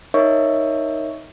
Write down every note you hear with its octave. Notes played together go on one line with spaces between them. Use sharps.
D#4 A#4 C#5 D#5 E5 C#6